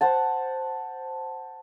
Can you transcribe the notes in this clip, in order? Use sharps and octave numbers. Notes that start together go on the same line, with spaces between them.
C5 F#5 A5